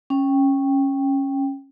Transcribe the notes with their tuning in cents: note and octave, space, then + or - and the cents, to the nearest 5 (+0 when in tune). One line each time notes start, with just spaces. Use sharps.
C#4 -10 G5 +0